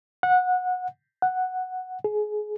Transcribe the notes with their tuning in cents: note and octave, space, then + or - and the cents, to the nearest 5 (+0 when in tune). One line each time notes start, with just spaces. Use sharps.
F#5 -20
F#5 +0
G#4 +25